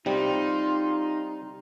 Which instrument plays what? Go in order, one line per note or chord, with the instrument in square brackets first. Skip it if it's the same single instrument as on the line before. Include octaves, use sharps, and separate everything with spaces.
[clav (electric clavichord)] C3 G3 [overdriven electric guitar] D#4 [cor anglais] F4